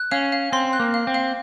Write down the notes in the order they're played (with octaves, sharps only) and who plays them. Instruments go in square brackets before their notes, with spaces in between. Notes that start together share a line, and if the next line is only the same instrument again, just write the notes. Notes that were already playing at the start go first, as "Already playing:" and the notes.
Already playing: [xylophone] F#6
[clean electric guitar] C#4 [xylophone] F5
[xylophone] F5
[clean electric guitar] C4 [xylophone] C6
[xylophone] F#6
[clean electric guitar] A#3
[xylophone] F5
[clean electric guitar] C4
[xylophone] F5